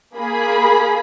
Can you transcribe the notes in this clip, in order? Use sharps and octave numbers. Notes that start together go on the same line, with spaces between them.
A#3 G#4 B5